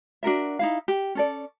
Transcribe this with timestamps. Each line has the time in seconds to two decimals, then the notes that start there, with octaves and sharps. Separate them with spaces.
0.23 D4 F#4 A#4 E5
0.59 D#4 E4 F5
0.88 G4
1.15 C#4 A4 D5